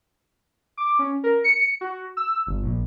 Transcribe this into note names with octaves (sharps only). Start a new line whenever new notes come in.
D6
C#4
A#4
C#7
F#4
E6
G1
A#1